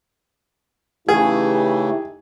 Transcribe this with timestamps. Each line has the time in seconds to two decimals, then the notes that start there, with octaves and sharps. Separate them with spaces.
1.08 C#3 E3 A3 D#4 E4 G4 G#4